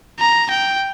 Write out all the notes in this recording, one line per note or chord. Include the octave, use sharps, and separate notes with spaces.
A#5
G5